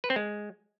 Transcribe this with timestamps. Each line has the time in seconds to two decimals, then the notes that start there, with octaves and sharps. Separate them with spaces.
0.04 B4
0.10 C4
0.16 G#3